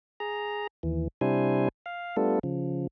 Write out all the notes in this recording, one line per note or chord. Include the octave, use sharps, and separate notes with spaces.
G#4 A#5
D#2 E3
C3 G3 D4 E4 C5 G#5
F5
G3 A3 B3 D4 F4 A4
C#3 F3